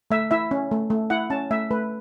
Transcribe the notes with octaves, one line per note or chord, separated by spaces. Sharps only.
A3 E5
E4 E5
C#4
A3
A3
E4 F#5
C#4 A5
A3 E5
A3 B4